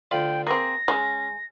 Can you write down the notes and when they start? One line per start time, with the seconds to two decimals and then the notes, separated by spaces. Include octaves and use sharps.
0.11 D2 F4 G5 B5
0.47 A#3 C4 G#4 A#6
0.88 G#3 C#4